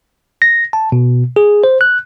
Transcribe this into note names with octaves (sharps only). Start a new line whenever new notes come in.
A#6
A5
B2
G#4
C5
F#6